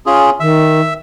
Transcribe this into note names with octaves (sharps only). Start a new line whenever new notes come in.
C#4 F4 G#4
D#3 E5